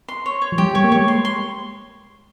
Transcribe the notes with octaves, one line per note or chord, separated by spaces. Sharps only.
C6
C#5
C#5
F3
G3 G4
G3 C#5
A#3
G#3 C#5
C6
C6